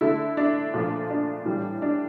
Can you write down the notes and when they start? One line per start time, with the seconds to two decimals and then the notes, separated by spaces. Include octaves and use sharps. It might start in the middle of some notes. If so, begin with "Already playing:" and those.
0.01 D3 A3 E4
0.37 D4
0.73 A#2 F3 A3
1.10 D4
1.45 A2 E3 G3
1.82 D4